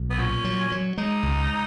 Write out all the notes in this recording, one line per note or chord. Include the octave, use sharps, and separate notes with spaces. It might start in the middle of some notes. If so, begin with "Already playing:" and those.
Already playing: B1
B3
A#2 C#4
F#3
F#3
G#3 D#4
C#2